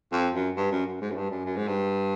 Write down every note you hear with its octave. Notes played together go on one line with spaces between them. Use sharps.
F2
F#2
G2
F#2
F#2
G#2
F#2
G2
F#2
F#2
G#2
G2